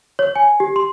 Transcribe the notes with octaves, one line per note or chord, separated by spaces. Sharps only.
C#5
G#5
G4
C6